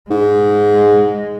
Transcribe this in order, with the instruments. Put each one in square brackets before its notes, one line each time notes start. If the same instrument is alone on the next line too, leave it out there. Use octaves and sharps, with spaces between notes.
[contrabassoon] G#2 [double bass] G#3